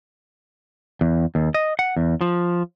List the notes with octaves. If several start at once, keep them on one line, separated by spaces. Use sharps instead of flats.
E2
D#2
D#5
F#5
E2
F3